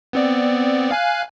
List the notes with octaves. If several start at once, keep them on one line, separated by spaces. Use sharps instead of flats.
B3 C4 D5
F5 G#5 F#6